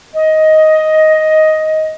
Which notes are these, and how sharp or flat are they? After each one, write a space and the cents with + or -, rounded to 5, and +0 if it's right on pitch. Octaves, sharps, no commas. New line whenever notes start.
D#5 +10